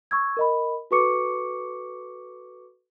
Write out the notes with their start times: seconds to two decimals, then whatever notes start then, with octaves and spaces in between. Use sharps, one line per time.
0.11 C#6 E6 G#6
0.37 A#4 D#5 B5
0.91 F#4 A4 B4 C#6 D6 C#7